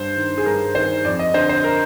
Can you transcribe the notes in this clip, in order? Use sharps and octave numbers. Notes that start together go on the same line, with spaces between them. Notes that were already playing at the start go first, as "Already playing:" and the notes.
Already playing: G2 C5
D#3
G#4
G2 A#4
D#3 C5
F2 D5
D#5
D3 C5
C5
A#4